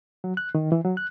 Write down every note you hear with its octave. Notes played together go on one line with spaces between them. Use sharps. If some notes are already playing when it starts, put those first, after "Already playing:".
F#3
F#6
D#3
E3
F#3
F#6